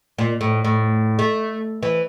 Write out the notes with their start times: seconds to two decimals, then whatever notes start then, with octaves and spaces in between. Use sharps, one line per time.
0.18 A#2
0.41 A2
0.64 A2
1.19 A3
1.83 E3